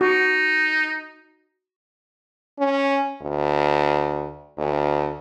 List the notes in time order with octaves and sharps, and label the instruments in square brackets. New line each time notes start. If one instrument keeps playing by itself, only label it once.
[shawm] D#4 [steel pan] F#4
[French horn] C#4
D2
D2